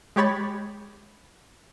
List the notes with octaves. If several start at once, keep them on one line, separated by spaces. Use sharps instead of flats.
G#3 G4 C#5 B5 A6